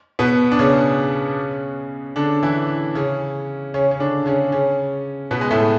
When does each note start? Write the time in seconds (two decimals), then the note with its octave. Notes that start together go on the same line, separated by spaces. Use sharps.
0.19 B2 B3
0.51 D4
0.59 C#3 C#4
2.16 D3 D4
2.43 E3 E4
2.95 C#3 C#4
3.74 C#3 C#4
3.91 C#4
4.00 D3 D4
4.26 C#3 C#4
4.52 C#3 C#4
5.31 B2 B3
5.41 G#3
5.51 A2 A3